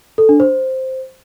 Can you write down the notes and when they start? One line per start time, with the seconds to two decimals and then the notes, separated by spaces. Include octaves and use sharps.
0.18 A4
0.29 D4
0.40 C5